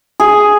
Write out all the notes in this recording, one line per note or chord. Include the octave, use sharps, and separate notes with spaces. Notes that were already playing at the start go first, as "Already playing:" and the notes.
G#4